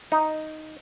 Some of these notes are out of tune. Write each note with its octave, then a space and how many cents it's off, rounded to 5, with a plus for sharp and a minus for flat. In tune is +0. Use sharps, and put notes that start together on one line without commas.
D#4 +0